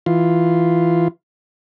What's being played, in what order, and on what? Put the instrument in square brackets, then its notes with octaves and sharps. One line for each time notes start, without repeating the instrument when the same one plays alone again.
[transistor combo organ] E3 F4